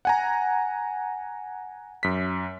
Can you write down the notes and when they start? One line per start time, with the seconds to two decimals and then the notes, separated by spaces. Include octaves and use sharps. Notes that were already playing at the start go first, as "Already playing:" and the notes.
0.05 F#5 G#5 A#5
2.03 F#2 B6